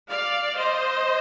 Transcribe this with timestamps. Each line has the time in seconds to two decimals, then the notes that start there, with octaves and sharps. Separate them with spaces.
0.10 D5 F5
0.57 C5 D#5